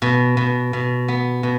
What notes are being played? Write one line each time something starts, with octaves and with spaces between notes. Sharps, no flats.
B2
B2
B2
B3
B2